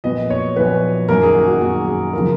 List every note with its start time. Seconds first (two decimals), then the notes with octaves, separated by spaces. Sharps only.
0.04 A#1 A#2 F#3 B3 D#5
0.30 C#5
0.56 A#1 A#2 F#3 B3 B4
1.09 F#2 D#3 F#3 A#3 A#4
1.22 G#4
1.35 F#4
1.47 F#4
1.61 F#2 D#3 F#3 A#3 F#4
1.87 G#4
2.13 C#3 F3 A#4